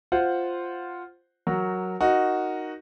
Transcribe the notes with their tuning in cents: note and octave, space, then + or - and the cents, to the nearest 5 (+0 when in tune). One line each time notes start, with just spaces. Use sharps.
F4 +0 C5 +0 F#5 +0
F#3 +0 F#4 +0 A#4 +0
D#4 +0 F#4 +0 A#4 +0